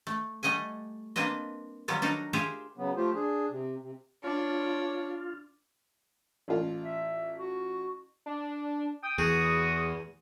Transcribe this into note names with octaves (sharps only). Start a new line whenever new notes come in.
A3
G3 A3 D#5 F#5 G#5
A#3 C4 D4 B4 D#5
D#3 F#3 G3 B3 F4
D4 D#4 F#4 A4 A#4
F4 G4 G#4 C5 E5 G5
C#3 F#3 B3
F3 A3 F4 G4 C5
D4 G#4
C3
C3
D4 F4 C#5
A1 F4
E5
F#4
D4
G5 D#6
E2 F#4 G#4 D#6